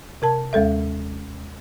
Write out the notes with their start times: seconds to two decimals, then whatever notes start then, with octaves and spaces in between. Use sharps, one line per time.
0.22 C3 A#4 A5
0.53 D#2 G#3 A4 E5